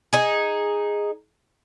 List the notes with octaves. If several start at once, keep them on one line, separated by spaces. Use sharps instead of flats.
D#4 G#4